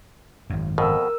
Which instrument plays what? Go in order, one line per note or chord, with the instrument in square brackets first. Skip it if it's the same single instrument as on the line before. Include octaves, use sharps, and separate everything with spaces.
[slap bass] G#1 F#2
[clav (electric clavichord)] F2 B2 [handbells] A#4 E6